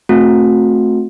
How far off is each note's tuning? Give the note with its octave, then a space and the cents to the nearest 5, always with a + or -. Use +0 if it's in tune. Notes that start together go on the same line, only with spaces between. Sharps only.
A3 +0 C4 +0 F#4 -45